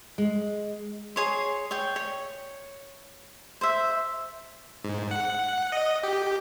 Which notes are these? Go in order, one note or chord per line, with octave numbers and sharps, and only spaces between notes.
G#3
G#4 C#5 C6
C#5 G5
C#5
C5 E5
G#2
F#5
D#5
G4